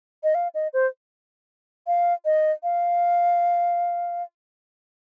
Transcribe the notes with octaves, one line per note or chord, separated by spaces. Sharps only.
D#5
F5
D#5
C5
F5
D#5
F5